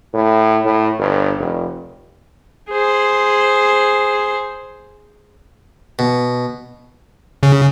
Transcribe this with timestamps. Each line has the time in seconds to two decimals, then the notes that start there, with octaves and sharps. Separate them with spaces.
0.14 A2
0.65 A2
0.98 G1
1.38 F1
2.70 G#4 C5
5.99 B2
7.43 C#3